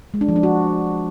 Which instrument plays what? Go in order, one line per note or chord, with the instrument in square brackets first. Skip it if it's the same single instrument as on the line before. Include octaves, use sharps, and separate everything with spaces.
[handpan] G#3
D4
F3
D4
F#4